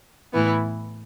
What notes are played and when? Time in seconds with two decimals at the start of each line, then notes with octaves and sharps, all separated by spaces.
0.33 A2 E3 B3 E4